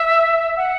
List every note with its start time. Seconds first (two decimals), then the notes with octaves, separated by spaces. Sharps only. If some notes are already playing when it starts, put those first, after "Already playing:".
Already playing: E5
0.57 F#5